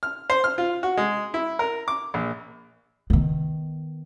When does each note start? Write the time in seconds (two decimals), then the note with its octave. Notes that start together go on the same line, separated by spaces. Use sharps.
0.03 F6
0.30 C5
0.44 F6
0.58 F4
0.83 F#4
0.97 G#3
1.34 E4
1.59 A#4
1.88 D6
2.14 A#1
3.10 D#3 B3